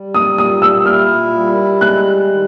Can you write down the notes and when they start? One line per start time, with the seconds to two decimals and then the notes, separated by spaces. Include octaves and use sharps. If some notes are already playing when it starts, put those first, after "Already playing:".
Already playing: G3
0.14 D#6
0.38 A#2 D#6
0.62 E6
0.86 E4 F6
1.33 G3
1.81 G#3 F#6
2.27 D#3